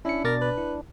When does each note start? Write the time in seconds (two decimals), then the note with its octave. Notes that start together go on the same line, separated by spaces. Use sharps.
0.05 C#4 D4 E4 C#7
0.24 B2 A#4 D5 A6
0.41 B4
0.58 E4